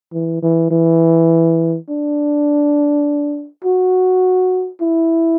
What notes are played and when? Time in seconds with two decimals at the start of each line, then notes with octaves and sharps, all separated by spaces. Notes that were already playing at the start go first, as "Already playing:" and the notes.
0.13 E3
0.42 E3
0.71 E3
1.89 D4
3.64 F#4
4.81 E4